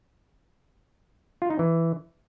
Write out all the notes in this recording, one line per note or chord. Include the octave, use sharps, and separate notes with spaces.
F4
D#4
E3